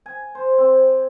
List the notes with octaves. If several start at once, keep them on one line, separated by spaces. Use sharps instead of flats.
G#5
C5
C4